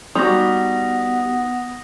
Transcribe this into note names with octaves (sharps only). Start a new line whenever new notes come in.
G3 B3 D#4 F#4 D#6 A#6